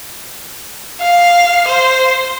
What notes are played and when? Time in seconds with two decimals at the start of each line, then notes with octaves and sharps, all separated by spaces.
1.01 F5
1.68 C5